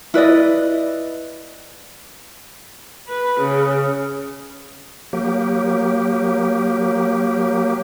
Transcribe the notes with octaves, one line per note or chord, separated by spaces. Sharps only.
E4 B4 D5 D#5
B4
C#3
F#3 A#3 G4